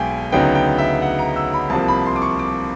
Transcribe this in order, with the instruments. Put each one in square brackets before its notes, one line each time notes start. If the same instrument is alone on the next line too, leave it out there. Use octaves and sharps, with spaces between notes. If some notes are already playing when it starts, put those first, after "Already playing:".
Already playing: [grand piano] B1 B2 G#3 G5 G#5
D2 C#3 F#3 B3 D#4 G5
G5
E5
F#5
A#5
E6
B5
C2 C3 F3 A#3 A5
B5
C6
D6
C#6
D6